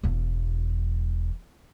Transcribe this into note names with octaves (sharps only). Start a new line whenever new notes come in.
E1 E2